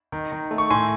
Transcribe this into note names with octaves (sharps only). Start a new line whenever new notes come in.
D#3
D#3
A3
C#6
A2 G#5 C6